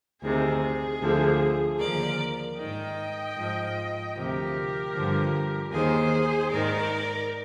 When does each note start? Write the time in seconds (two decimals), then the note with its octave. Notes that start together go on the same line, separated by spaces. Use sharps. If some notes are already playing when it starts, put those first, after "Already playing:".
0.22 D2 C3 D#3 G#4
1.00 D2 D3 F3
1.79 D#2 D3 F3 A#4 D5
2.57 G#2 D#3 D#5 G5
3.36 G#2 F3
4.14 D2 C3 F3 G4 A#4
4.93 G2 D3 F3
5.71 D#2 D#3 G#4 C5
6.50 G#2 D#3 A#4 D5